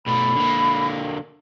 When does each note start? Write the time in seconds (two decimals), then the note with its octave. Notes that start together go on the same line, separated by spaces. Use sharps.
0.06 B2 A3 B5
0.36 D3 A#3